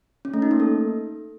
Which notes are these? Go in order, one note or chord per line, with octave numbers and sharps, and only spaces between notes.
C#4
A3
D#4
A#3
A4